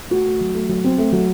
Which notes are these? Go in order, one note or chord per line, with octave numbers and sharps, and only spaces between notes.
A3 F#4
A3
F#3
A3
F#3
C4
A3
F#3